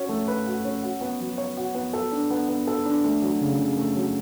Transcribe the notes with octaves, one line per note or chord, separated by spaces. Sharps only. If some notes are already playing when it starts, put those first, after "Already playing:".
Already playing: C#4 F#4
A3
B4
F#4
C#4
F#4
B3
F#3
C#5
F#4
B3
A4
D4
B3
B3
A4
D4
A3
F#3
C#3
C#3
A3
F#3